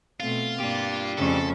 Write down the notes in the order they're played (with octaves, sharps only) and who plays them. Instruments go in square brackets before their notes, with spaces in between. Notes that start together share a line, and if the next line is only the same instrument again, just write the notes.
[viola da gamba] B2 A3 C4 [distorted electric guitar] F4
[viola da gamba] A#3 [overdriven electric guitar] D4 G4
[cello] F2 C#4 [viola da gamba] C#3 A3 [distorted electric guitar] A4